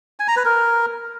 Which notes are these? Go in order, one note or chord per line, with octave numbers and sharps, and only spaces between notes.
G#5
A#5
B4
A#4